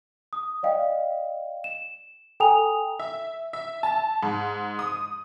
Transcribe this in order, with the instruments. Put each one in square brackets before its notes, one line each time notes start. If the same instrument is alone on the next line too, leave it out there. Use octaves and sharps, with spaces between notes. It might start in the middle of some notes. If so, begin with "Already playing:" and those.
[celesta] D#6
D5 D#5 F5 G5
E7
A4 G5 G#5 A#5 D#6 F7
[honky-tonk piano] E5
E5
A5
G#2
D#6